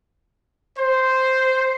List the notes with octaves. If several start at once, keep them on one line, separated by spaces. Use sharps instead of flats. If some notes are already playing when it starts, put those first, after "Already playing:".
C5